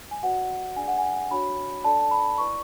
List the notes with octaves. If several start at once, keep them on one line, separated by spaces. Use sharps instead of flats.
G#5
F#4 B4 D5 F#5
F#5
D4 G#4 D5 G#5
F#5
G#5
D4 F#4 C#5 B5
D4 A4 D5 A5
A5
B5
E4 B4 D5 C#6